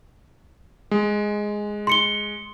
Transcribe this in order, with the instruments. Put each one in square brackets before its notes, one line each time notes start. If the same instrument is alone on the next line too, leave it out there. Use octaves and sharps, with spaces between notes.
[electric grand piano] G#3
[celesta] C6 C#7 G7